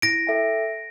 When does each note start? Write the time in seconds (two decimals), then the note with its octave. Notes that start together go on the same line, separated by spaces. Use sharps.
0.02 E4 A#6 D7
0.27 A4 E5 G5